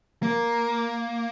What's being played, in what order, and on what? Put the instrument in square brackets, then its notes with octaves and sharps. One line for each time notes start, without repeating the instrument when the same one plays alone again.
[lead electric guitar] A#3